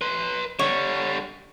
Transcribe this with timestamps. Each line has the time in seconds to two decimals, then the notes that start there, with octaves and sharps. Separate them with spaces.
0.01 B4 C6
0.59 D3 G3 C#5